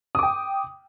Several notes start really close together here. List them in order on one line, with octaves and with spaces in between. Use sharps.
D#6 D6 G5